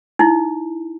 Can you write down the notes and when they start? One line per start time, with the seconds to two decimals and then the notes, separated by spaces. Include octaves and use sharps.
0.19 D#4 E4